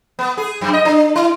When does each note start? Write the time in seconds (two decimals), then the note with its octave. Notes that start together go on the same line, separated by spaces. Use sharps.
0.19 B3
0.37 G#4
0.61 F#2
0.73 D#5
0.85 D4
1.16 E4